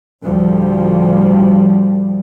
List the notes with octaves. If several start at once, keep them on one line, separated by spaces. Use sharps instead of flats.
D2 A2 F3 G3